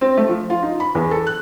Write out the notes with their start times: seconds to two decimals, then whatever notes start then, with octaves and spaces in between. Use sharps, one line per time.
0.01 C4
0.17 A3
0.29 F3
0.50 F4
0.62 D#4
0.80 B5
0.95 E2
1.11 A4
1.27 F#6